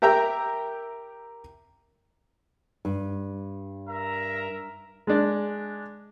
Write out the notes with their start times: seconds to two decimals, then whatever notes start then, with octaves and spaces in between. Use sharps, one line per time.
0.02 G4 A#4 E5 G5 A#5
2.85 G2
3.89 A#4 E5 A#5
5.07 G#3 D4